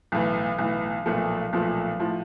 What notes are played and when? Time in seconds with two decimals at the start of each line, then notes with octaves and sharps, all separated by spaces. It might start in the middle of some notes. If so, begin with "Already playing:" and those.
0.12 B1 A2 E3
0.58 B1 A2 E3
1.06 B1 A#2 F3 A3
1.53 B1 A#2 F3 A3
2.00 A2 F3